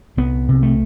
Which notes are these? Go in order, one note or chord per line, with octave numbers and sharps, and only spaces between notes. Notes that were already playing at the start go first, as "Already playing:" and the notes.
C2 B3
C3
A3